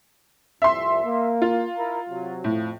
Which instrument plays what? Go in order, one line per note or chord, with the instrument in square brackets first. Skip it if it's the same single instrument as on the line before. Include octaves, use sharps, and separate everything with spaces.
[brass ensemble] C2 F2 [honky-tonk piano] E5 C6
[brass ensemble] A#3
[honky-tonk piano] F4
[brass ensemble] E4 A#4 A#5
C3 F#3
[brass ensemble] F2 [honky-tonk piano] A2